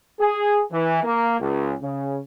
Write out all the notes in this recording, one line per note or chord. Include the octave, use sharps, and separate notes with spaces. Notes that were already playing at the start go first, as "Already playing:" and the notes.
G#4
E3
A#3
C#2
C#3